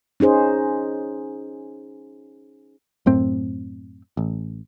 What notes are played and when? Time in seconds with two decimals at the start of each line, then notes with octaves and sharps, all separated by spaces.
0.20 C#4 D#4 G#4 C5
3.06 F#2 A2 C4
4.17 A1